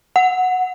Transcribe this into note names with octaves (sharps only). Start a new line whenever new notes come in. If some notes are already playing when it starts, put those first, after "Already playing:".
F#5